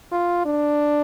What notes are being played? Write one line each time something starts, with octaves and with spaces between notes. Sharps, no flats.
F4
D4